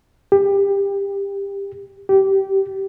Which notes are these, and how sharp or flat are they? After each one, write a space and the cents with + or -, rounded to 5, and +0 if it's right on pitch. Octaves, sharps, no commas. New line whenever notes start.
G4 +20
G4 -20